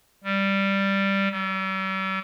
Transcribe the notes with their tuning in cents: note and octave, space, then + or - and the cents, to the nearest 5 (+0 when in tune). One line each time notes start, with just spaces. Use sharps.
G3 +0
G3 -45